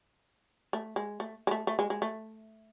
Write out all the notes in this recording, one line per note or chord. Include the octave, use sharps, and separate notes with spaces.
A3
G#3
A3
G#3
A3
A3
G#3
G#3
A3